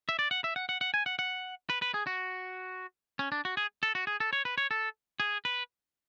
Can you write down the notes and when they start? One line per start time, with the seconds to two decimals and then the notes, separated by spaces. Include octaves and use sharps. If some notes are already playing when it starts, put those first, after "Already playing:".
0.09 E5
0.19 D5
0.31 F#5
0.44 E5
0.56 F#5
0.69 F#5
0.81 F#5
0.94 G#5
1.06 F#5
1.19 F#5
1.70 B4
1.82 B4
1.94 G#4
2.07 F#4
3.19 C#4
3.32 D4
3.45 F#4
3.57 G#4
3.83 A4
3.95 F#4
4.07 G#4
4.20 A4
4.33 C#5
4.45 B4
4.58 C#5
4.71 A4
5.20 G#4
5.45 B4